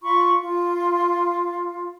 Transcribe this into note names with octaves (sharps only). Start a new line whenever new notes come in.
F4 B5 C#6
F4